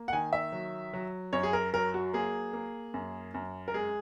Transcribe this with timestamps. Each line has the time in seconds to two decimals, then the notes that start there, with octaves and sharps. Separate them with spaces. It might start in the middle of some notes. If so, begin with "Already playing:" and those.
Already playing: A#3
0.08 F#5
0.12 D#3 G#5
0.33 E5
0.52 F#3
0.93 F#3
1.33 F#2 C#5
1.43 G#4
1.53 A#4
1.73 F#3 A#4
1.94 F#4
2.13 A#3 G#4
2.53 A#3
2.94 F#2
3.34 F#2
3.68 A#4
3.74 G#3 G#4